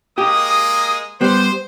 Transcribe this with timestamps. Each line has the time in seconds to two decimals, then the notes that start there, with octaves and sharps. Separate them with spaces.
0.18 G#3 A#3 G4 D#6
1.21 G3 B3 C5